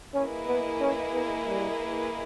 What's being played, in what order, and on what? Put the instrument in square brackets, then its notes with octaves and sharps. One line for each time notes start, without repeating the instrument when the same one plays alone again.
[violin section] A#3 E4 G#4 B4 D#5 [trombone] C#4
[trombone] B3
C#4
B3
G3